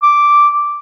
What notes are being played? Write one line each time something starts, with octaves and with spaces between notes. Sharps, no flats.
D6